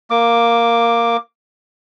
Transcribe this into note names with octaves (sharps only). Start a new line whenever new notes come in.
A#3 D6